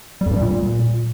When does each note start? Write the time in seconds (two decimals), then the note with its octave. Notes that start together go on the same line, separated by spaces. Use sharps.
0.21 G3
0.26 F2
0.31 G2
0.36 G3
0.41 A#2